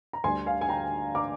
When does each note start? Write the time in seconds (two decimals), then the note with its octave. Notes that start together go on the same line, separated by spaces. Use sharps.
0.13 A#5
0.24 D2 D3 G3 G#5 C6
0.46 F5 G#5
0.61 G#5
0.69 G5 A#5
1.15 A#5 D6